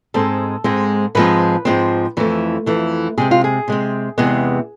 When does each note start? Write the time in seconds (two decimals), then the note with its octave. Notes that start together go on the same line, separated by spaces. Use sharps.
0.14 G#2 G#3 C4 A4
0.64 G#2 G#3 C4
1.15 G#2 F3 G#3 C4 B4
1.65 G#2 F3 G#3 C4
2.17 F2 E3 A3
2.66 F2 E3 A3
3.18 C3 G#3 C4 G#4
3.31 F4
3.44 G#4
3.68 C3 G#3 C4
4.18 E2 C3 G#3 B3